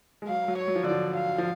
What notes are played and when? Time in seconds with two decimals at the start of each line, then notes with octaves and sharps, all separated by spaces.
0.22 G#3
0.28 F#3 F5
0.48 F#3
0.58 C#5
0.68 F#3
0.75 F3
0.83 D3
0.88 F3 D5
1.16 F5
1.38 F3